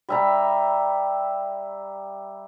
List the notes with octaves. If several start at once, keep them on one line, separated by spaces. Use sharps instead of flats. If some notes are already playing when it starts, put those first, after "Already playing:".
G3 E5 A#5